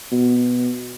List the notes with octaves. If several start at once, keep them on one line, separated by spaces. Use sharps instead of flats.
B2